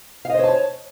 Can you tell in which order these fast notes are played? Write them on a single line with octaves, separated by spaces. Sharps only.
F5 D#5 C5 C#5 A5